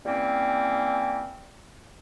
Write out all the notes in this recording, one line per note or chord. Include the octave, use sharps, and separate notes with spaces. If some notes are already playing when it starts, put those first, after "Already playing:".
E3 G3 A#3 C4 C#4